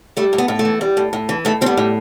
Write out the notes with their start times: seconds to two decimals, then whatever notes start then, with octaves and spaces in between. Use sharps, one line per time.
0.17 G3 A3
0.33 A2
0.38 B3
0.48 A2
0.59 A3
0.65 E3
0.81 G3
0.97 A2
1.13 A2
1.29 E3
1.45 A2 A3
1.61 G3 C4
1.66 B3
1.77 A2